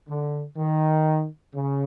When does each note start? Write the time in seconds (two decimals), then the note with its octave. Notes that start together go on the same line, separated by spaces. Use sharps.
0.09 D3
0.57 D#3
1.54 C#3